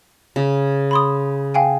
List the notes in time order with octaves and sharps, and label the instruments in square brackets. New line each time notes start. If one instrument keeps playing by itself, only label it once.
[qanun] C#3
[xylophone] B5 C6 D#6
F5 G5 G#5